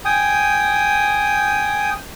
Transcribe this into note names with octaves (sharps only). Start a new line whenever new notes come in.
G5 G#5 D#6